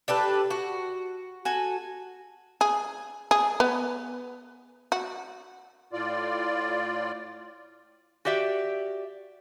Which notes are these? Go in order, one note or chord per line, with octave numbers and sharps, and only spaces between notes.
D4 G4 A4 B4
F#4
F#4 A4 G#5
G#4
G#4
B3
F#4
A2 F4 D5
F#4 G4 D5 E5